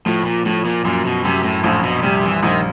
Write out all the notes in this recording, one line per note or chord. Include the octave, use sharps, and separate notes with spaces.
A2 F3
A#2
A2 F3
A#2
F#2 A#2
B2
F#2 C3
A2
A#1 A2
B2
C3 G3
E3
A#1 D#3